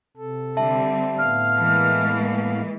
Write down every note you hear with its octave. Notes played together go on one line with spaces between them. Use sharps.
C3 A4
D3 G3 C4 E5 A5
A2 B3 F5 F6
E3 G#3 A#3 A5